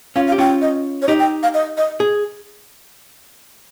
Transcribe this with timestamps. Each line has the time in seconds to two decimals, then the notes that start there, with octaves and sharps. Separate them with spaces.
0.16 C#4 F4 F5
0.27 F5
0.32 G4
0.38 C#4 F4 G5
0.62 D#5
1.02 C#5
1.08 D#4 G4 D#5
1.19 G5
1.43 F5
1.54 D#5
1.77 D#5
2.00 G#4